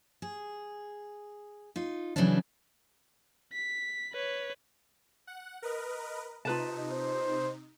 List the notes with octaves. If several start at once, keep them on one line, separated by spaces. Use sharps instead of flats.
G#4
D#4 F4
C#3 E3 F#3 A3 C#4 D4
B6
B4 C#5
F#5
A#4 B4 D#5
C3 D#4 F4 B4 A5
C5